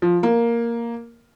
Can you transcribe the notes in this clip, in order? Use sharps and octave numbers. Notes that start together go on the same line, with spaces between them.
F3
A#3